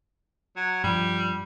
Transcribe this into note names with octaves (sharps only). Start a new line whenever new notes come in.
F#3
G2 F3 G3